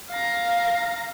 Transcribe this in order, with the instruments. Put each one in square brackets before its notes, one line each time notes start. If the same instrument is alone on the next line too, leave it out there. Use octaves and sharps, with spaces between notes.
[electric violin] F5 A#5